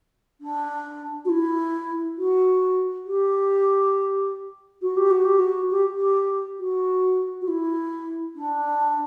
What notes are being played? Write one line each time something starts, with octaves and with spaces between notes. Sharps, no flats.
D4
F#4
E4
F#4
G4
F#4
G4
F#4
G4
F#4
G4
G4
F#4
F#4
E4
D4